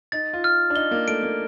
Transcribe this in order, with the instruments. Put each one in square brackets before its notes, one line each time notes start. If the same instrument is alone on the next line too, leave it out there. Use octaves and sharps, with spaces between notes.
[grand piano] D#4 [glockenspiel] A6
[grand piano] F4
[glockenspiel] F6
[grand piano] D4
[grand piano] D#4 [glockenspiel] G7
[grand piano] A#3
[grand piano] A3 [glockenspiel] D7
[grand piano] A#3